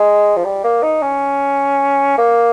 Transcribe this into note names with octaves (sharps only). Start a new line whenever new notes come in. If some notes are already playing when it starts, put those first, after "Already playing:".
Already playing: G#3
F3
G3
A#3
D#4
C#4
A#3